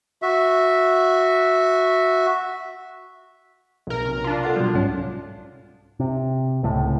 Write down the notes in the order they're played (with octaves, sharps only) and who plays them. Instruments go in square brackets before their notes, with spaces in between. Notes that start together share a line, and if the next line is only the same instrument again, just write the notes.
[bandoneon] F#4 E5
[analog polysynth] B1 A#4
[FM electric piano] C3
[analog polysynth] D4 F4
[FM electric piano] A4 F#5 C6
B2 F#3 G3
C2 G#2 C#4
[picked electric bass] C3
C#2 A2